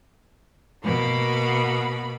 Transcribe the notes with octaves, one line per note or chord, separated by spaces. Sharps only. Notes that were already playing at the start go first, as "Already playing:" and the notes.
B2 A#3 B5